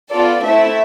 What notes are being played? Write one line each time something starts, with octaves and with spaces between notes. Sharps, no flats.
B3 F4 A4 D5
A3 C4 E4 E5